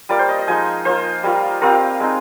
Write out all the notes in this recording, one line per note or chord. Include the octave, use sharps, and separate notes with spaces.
G3 A#3 F4 D5
C5
D#5
D#5
F3 G#3 D#4 G#5
A#3 F4 C5
G3 A#3 F4
G3 C4 F4 A#4
G#3 C4 D#4